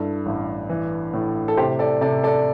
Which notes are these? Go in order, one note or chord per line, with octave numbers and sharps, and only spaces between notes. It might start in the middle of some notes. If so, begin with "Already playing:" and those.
Already playing: G2 E4 A4
A1
E3
A2
A4
C3 G4 C5
A4 D5
C3 A4 D5
A4 D5